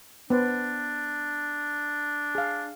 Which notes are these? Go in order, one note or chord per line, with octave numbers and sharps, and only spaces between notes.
B3 D4 B4 C5
G#4 F5